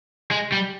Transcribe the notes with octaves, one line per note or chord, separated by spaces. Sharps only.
G#3
G3